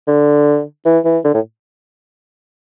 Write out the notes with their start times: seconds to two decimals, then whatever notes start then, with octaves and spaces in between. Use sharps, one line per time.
0.08 D3
0.85 E3
1.05 E3
1.24 D3
1.34 A2